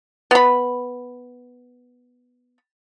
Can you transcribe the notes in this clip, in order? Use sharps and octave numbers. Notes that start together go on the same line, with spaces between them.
B3 B5